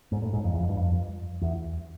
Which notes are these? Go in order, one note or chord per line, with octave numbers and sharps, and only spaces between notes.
G#2
A2
G#2
F2
E2
F2
G2
F2
E2